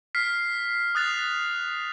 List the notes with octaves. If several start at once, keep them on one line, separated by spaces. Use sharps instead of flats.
F6 B6 C7
D#6 F#6 A6 F7